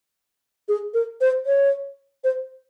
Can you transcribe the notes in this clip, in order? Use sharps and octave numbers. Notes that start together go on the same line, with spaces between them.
G#4
A#4
C5
C#5
C5